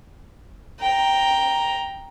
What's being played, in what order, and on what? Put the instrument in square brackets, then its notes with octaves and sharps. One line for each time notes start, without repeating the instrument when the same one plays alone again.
[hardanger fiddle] G5 A#5